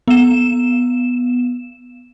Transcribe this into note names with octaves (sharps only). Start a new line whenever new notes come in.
B3 E7